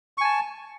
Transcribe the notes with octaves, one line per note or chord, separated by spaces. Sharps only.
G#5 A5 C#6